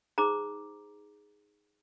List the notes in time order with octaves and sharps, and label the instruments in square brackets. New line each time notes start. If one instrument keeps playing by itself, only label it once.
[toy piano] D#4 G#4 C5 A#5 D6